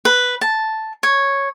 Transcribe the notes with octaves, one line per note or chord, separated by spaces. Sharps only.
B4
A5
C#5